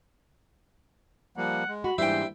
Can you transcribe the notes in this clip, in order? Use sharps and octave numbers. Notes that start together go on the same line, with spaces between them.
F3 G3 A#3 F#5
G#3
F#4 B5
G#2 E3 G3 A#3 D4 E4 C5 G5